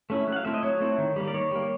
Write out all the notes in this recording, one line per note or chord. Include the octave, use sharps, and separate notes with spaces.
A3 C#4 E4
F#3
F#5
F5
A3 C4 E4 E5
D#5
F#3 C#5
A3 C4 E4
D#3
G3 A#3
D5
D#3 C#5
G3 A#3